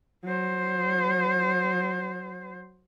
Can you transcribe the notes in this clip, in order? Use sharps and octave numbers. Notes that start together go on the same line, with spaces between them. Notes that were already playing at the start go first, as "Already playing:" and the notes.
F#3 C5